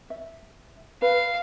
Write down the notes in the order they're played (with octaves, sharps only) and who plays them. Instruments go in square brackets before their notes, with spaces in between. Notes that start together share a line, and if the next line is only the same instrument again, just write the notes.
[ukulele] E5
[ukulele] B4 [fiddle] F5